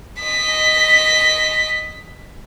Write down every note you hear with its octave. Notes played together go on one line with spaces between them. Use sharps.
D#5 B6